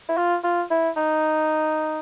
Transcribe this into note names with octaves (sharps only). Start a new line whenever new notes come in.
E4
F4
F4
E4
D#4